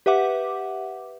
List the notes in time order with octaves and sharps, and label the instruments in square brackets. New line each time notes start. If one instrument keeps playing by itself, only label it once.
[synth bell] G4 B4 E5 F#5 D6